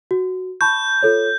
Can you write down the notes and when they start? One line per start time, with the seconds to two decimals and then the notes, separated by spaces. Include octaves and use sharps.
0.11 F#4
0.61 A5 B5 C#6 G6
1.03 F4 A4 C#5